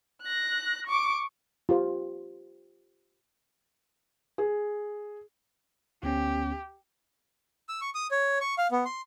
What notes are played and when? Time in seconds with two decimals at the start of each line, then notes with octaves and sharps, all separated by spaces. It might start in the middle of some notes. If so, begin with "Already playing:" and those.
0.22 F#6 A#6
0.87 C#6 D6
1.69 F4 G4 C5
4.38 G#4
6.03 D2 B3 C#4 G4
7.69 E6
7.81 C#6
7.95 D#6
8.11 C#5
8.41 C#6
8.58 F5
8.71 B3
8.85 C6